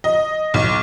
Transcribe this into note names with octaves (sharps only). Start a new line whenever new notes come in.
D#5
B1